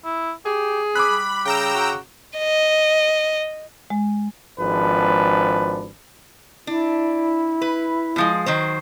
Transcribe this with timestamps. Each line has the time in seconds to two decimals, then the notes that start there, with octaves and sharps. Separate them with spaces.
0.05 E4
0.45 G4 G#4
0.95 C4 B5 D6 F#6
1.10 G3
1.45 C#3 G5 A#5 E6
1.73 F#4
2.38 D#5
3.90 G#3
4.59 G#1 G#2 F3 D4 B4
6.67 D4 E4
7.62 B4
8.16 B2 F3 G#3
8.46 D#3 F#3 C5